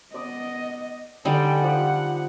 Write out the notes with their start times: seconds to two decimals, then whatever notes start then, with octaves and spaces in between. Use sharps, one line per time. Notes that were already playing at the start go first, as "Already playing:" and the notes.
0.14 B3 D5 D#5 D6 D#6
1.25 D3 G3 D#4 A4 G5 G#5
1.64 F3 G4 F#5